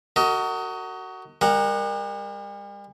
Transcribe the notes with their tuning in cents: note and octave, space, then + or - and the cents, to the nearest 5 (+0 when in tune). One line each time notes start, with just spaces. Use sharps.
F#4 +20 A#4 -40 D#5 +20
G3 +45 A#4 +0 F#5 -5